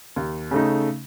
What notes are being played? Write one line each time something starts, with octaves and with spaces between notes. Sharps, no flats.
D#2
C#3 A3 D#4